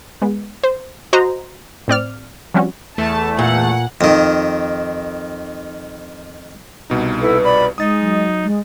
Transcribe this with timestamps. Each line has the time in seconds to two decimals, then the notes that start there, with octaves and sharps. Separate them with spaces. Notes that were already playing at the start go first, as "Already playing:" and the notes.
0.22 G#3 B3
0.63 C5
1.13 F#4 C5 D#5 A#5 C6
1.88 A2 C4 D5 F6
2.54 F3 G3 C4 C#4 F#4
2.98 E2 A3 A5
3.39 A#2 F#5
4.01 F2 D#3
6.90 C2 B2 D#4
7.21 E4 A4 B4
7.44 D5 B5
7.78 G#3 D#4 D#6 A6
8.00 F#3
8.44 G#3